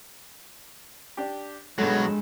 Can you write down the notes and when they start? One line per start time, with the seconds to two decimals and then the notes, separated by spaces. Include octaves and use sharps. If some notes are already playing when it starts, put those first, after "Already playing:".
1.17 D4 G4
1.78 G2 B2 F#3 G#3 A3